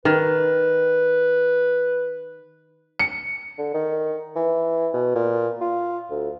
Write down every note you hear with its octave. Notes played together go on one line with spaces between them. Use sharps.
D#3 B4
C#7
D3
D#3
E3
B2
A#2
F4
D2